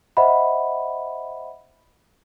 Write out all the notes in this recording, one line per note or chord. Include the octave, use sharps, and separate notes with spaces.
C5 D#5 E5 F#5 B5